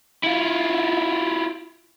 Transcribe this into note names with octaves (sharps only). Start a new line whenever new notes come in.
E4 F4